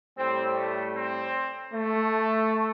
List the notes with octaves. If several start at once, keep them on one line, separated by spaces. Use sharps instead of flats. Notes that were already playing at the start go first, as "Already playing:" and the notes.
A2 G3 C4
A3
C4
A3